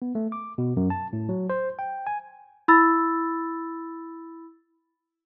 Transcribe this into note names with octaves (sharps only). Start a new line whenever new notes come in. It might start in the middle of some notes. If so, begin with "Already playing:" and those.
B3
A3
D6
B2
F#2
A5
A2
F#3
C5
G5
G#5
E4 B5 E6 A6